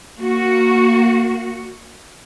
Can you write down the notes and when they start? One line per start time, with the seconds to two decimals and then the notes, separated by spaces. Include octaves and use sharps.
0.18 A#3 F#4